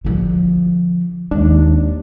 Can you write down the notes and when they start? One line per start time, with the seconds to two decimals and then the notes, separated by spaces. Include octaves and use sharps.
0.05 D3 F3
1.31 D#2 G#3 D4